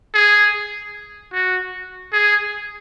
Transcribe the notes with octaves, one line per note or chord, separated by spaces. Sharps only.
G#4
F#4
G#4